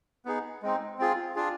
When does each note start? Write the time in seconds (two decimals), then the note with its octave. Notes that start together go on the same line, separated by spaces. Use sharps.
0.25 B3 D#4 G#4
0.62 G#3 C4 D#4
0.99 C4 F4 G#4
1.35 D4 F4 G#4